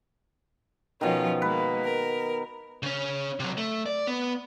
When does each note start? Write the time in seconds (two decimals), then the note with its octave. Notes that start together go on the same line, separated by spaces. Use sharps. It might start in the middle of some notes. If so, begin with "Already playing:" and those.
1.01 B2 D#3 F3 C#4 F4
1.42 G#3 A#3 B4
1.84 A#4
2.83 C#3 C#4
3.40 C3 F#3
3.58 A3
3.86 D5
4.07 B3